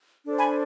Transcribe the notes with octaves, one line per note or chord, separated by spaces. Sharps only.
D4 A4 C5
G#5 B5